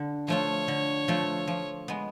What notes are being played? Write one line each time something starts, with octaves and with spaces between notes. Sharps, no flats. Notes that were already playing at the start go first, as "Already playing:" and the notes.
Already playing: D3
F3 A3 F4 C#5
D3
F3 A3 F4
F3
G#3 B3